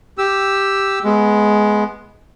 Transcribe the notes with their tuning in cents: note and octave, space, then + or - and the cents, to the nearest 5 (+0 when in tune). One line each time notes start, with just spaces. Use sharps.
G4 +0 E6 +0
G#3 +15 B3 +0